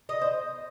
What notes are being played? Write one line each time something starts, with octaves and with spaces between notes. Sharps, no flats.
D#5
C5